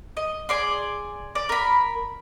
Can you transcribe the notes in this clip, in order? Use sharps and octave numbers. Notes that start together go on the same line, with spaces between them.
D#5
G#4 D5 C6
D5
A#4 B5